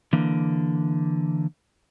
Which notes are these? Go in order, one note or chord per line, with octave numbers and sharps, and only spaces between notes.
D3 E3 A#3